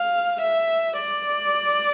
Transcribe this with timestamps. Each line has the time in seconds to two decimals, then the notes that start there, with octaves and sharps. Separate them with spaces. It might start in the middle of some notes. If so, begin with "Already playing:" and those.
Already playing: F5
0.41 E5
1.00 D5